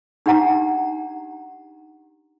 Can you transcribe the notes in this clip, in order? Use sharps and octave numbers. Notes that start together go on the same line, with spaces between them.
D4 D#4 G4 F#5 A#5